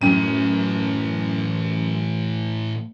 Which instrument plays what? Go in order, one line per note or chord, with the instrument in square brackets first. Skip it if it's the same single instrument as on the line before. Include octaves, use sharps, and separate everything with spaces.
[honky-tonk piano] F#2 D#7 [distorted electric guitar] A2 E3